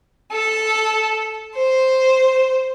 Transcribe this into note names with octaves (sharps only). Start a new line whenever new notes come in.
A4
C5